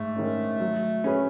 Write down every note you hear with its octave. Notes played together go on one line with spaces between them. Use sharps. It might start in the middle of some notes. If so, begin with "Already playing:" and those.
Already playing: G#2 A3
D#3 G#3 C#4
F#3
C#4 G#4 B4